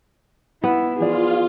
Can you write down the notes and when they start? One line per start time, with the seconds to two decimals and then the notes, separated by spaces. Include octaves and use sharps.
0.64 B3 E4
0.98 E3 F3 F4 G#4 D5